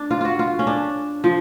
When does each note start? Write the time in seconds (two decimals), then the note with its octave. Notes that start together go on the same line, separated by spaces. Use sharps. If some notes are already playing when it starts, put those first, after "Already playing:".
Already playing: D4
0.11 F4
0.21 F4 F#4
0.39 F4
0.59 C#4
0.67 D4
1.24 F3